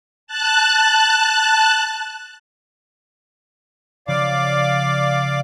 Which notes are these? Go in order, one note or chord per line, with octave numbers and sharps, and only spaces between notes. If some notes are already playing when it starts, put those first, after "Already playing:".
A5 F#6
C#3 F3 G#3 D5 F5 D6